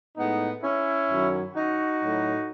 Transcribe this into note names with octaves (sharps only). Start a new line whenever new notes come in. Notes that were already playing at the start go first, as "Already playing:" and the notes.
A2 G#3 B3 D#4
C#4 E4
F#2 D#3 F#3
D#4 F#4
A2 F#3